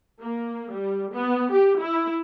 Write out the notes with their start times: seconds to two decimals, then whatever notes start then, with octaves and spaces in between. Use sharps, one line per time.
0.20 A#3
0.73 G3
1.14 B3
1.52 G4
1.82 E4